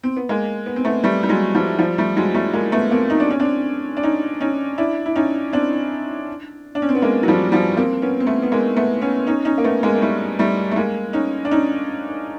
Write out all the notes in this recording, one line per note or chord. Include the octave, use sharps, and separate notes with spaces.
C4
B3
G#3 A#3
B3
C4
A3 B3
G3 A3
G3
F#3 G#3
F3 G3
F3 G3
G3 A3
F#3 G#3
G3 A3
G#3 A#3
A3 B3
A#3 C4
D#4
D4
C#4
C4 D4
D4
C#4 D#4
C#4 D#4
D4 E4
E4
C#4 D#4
C4 D4
D4
C#4
C4
B3
G#3 A#3
F#3
F3 G3
F3 G3
A#3 C4
B3 C#4
C4
A3 B3
B3
G#3 A#3
A3 B3
B3 C#4
C#4 D#4
C#4 D#4
A#3
A3 B3
G#3 A#3
A#3
G3 A3
G3 A3
A3
G#3 A#3
C#4 D#4
D4
C#4 D#4